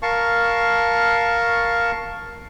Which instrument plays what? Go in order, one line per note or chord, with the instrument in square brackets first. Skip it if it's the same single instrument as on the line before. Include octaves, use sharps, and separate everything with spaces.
[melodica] A#4 F5 A5 C#6